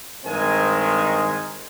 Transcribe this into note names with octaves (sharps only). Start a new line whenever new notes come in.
G2 D#3 G#3 C4 C5 G#5